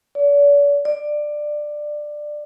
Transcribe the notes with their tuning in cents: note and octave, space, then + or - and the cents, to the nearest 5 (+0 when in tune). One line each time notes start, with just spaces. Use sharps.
D5 -45
D5 +15